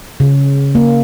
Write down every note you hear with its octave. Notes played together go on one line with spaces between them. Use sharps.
C#3
A#3